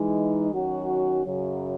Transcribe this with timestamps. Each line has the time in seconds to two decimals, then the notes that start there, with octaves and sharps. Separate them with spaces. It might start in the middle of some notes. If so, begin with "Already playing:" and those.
Already playing: E3 G#3 D#4
0.51 D#3 F#3 C#4 F#4
1.25 F#2 C#3 F#3